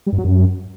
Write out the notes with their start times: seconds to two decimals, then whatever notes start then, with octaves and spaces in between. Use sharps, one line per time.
0.07 G3
0.12 G2
0.18 F#3
0.24 F#2